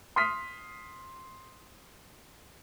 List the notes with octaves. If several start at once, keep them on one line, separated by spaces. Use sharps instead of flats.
C6 D#6 F6 B6